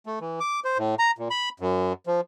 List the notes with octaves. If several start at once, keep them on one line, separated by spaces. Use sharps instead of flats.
A3
E3
D6
C5
A2
A#5
A#2
B5
F#2
F3